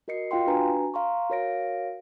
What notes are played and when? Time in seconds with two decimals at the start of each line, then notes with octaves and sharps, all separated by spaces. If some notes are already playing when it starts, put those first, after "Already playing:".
0.08 F#4 A#4 D#5 C7 C#7
0.31 F4 F5 G5 C6
0.47 D4 F#4 B4 G#5 A#5
0.94 F5 A#5 C6 C#6
1.30 F#4 A#4 C#5 F5 A#6 D7